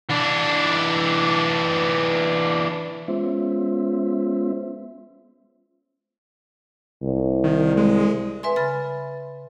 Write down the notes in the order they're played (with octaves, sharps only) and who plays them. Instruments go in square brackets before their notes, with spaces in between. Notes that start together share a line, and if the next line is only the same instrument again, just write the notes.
[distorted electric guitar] E3 D4
[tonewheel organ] G#3 B3 C#4 F4 C5 E5
[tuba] C2
[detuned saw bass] D#3
G#3
[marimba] B4 E5 G#5 C6
C#3 B5 A6